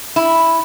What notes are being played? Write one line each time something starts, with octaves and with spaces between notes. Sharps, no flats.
E4